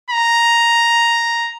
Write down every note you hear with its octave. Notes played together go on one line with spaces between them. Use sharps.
A#5